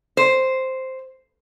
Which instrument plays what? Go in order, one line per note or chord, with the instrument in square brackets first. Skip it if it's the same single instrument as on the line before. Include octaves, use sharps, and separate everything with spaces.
[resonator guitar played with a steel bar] C5